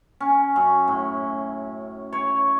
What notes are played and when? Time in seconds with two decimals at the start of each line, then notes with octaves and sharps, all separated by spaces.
0.20 C#4
0.56 F#2
0.88 A2
2.13 C#5